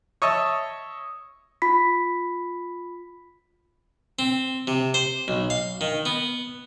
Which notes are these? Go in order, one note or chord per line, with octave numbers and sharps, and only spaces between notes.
C#5 D#5 E5 A5
F4 B5 B6
C4
C3
C5
B1
F5
D#3
B3